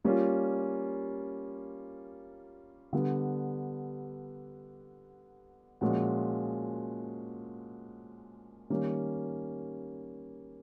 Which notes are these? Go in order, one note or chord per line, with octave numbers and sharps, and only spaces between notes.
G3 A#3 C#4 F4
D3 G3 B3
A#2 F3 G#3 C#4 F#4
D#3 G3 A#3 C#4